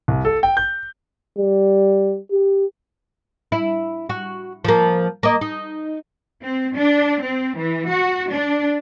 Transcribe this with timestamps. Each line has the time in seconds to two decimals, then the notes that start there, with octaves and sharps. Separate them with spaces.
0.08 C2
0.25 A4
0.43 G5
0.57 G6
1.38 G3
2.32 G4
3.52 E4
4.09 F#4
4.65 F3 A#3
5.23 A#3 D#5
5.41 D#4
6.42 C4
6.76 D4
7.23 C4
7.57 E3
7.90 F#4
8.32 D4